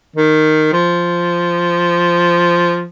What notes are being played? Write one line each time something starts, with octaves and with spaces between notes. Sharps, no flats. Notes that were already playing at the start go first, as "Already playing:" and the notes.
D#3
F3